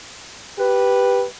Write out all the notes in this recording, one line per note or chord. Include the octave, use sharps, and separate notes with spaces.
G4 B4